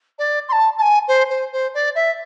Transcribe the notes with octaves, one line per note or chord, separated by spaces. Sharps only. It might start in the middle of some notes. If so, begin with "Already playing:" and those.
D5
C6
A5
A5
G#5
C5
C5
C5
D5
E5